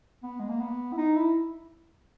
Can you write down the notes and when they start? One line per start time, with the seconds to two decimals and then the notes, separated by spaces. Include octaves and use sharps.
0.23 B3
0.40 G#3
0.49 A#3
0.60 B3
0.93 E4
0.97 D#4
1.17 E4